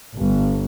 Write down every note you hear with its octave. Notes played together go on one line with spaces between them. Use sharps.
G1